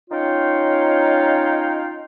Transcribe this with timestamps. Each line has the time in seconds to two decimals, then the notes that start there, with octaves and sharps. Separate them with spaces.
0.10 C#4 D#4 F4 C#5 F5 G5